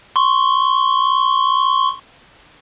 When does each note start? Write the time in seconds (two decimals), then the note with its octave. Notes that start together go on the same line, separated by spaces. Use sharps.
0.16 C6 C#6